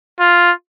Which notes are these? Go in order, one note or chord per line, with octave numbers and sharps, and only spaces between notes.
F4